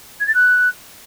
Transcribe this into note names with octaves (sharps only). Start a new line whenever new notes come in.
G#6
A6
F#6